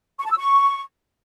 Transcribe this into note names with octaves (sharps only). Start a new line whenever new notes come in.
C#6
A5
E6
C#6